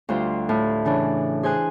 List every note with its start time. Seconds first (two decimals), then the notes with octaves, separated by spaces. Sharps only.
0.09 D2 G3 F4 C5
0.49 A2
0.85 C#3 E3 D4
1.43 G#4 C5 G#5 F#6